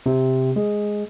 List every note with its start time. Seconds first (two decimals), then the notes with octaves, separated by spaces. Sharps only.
0.06 C3
0.56 G#3